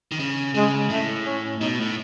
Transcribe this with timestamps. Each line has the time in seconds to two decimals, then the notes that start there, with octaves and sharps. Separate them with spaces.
0.12 D#3
0.20 C#3
0.55 C#3 G#3
0.90 A2 A3
1.25 C#4
1.60 B2 D#4
1.79 A2